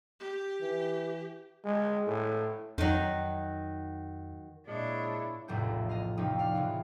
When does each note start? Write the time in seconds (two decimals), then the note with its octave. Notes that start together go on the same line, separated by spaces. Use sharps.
0.20 G4
0.61 E3
1.65 G#3
2.07 A2
2.78 F2 D#3 F#3
4.68 A#2 G#3 D4 E4 C#5
5.48 F1 A#1 E2 A2 G6
5.89 D#5 F5
6.17 F2 C3 F3 C#4 D#4
6.39 D5 F5 F#6
6.55 C#3 E3 D#4 F4